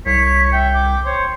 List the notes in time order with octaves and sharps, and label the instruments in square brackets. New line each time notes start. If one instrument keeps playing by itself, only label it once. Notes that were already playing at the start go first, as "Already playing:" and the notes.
[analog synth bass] C2 [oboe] C#5 [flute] B6
[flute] E5 [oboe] G5
[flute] D6
[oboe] C5 [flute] C#5